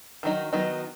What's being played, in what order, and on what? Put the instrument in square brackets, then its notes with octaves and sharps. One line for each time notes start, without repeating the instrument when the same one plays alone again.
[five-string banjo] D#3 F#3 D#4
D#3 F#3 B3 D#4